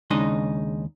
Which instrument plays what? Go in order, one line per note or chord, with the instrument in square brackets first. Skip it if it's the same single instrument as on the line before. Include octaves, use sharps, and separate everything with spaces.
[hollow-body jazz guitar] D#2 C#3 G#3 D4 D#4 D#5